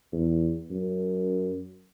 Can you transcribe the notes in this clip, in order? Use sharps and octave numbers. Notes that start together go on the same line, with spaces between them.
E2
F#2